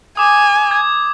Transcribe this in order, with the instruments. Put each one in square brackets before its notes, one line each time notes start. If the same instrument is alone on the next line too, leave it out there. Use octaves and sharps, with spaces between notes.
[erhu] G#5 [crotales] D6 D#6
[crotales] G#6